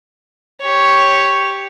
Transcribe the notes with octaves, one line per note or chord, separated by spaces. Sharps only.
G4 C#5